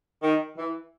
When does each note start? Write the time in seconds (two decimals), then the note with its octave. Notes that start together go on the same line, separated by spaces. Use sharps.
0.22 D#3
0.56 E3